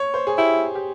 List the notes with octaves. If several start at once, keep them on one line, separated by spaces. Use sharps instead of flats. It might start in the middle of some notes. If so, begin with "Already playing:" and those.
Already playing: C#5
C5
G#4
E4 G4
G4